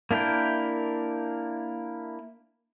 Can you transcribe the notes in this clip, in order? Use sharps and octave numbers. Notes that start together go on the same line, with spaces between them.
A#3 D4 E4 A#4 G5